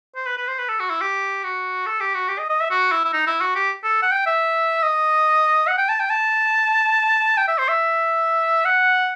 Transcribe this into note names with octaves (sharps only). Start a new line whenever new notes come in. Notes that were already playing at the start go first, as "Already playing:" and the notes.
C5
B4
B4
C5
B4
A4
F#4
E4
G4
F#4
A4
G4
F#4
G4
D#5
D#5
E5
F#4
E4
E4
D#4
E4
F#4
G4
A4
F#5
G5
E5
D#5
F#5
G5
A5
G5
A5
G5
E5
C5
E5
F#5